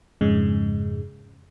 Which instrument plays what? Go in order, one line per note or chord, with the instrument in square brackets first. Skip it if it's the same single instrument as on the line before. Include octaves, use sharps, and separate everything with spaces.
[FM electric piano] F2 G#2 C#3 G#3